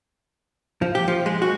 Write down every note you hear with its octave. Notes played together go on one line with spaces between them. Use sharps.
F3
G4
F3
G#3
F#4